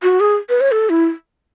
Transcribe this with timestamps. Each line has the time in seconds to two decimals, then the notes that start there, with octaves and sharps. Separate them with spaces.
0.03 F#4
0.20 G#4
0.49 B4
0.61 C#5
0.72 A4
0.90 E4